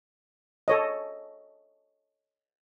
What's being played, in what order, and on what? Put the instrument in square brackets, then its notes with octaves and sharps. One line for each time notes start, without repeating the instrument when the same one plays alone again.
[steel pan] A4 C#5 D#5